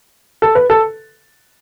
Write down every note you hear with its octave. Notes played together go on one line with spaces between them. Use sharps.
A4
B4
A4